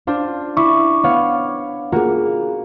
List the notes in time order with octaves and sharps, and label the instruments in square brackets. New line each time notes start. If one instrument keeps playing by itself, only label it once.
[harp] D4 F4 C5
[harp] E4 [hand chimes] C#6 D6
[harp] B3 C#5 F5
[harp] A#3 F#4 [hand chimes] F4 G#4